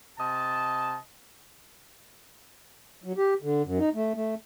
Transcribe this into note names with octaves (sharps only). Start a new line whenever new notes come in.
C3 D#5 A5
F#3
G4
D3
F#2
D#4
A3
A3